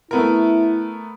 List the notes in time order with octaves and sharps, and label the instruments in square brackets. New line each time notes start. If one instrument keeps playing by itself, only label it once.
[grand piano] A3 B3 A#4 [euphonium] E4